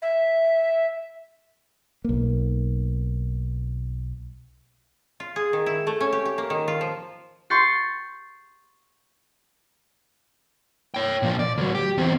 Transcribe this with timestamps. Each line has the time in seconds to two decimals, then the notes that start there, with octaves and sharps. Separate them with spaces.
0.02 E5
2.04 B1 A#3
5.20 F4
5.36 G#4
5.53 D#3
5.66 E4
5.87 A3
6.00 C#4
6.12 G4
6.25 G4
6.38 A#3
6.50 D#3
6.68 F4
6.81 F3
7.50 C6 C#6 G6 A6 C7
10.94 C#5 G5
11.23 A#2 F3
11.39 D5
11.58 D2 F#3
11.75 G4
11.98 E2 C4